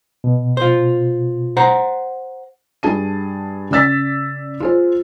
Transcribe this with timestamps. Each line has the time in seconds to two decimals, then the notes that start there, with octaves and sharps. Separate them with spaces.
0.24 B2
0.57 F4 C5
1.57 C5 F#5 A#5
2.83 G2 G#4 A5 D#7
3.71 C#3 D5 E6 A6 B6
4.60 F4 G#4 C5